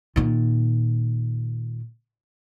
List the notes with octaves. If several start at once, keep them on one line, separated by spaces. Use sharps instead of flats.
A#2 D#3